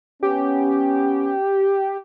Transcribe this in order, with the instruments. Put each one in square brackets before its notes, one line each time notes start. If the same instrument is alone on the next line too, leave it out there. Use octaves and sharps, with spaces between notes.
[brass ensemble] B3 C#4 [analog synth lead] G4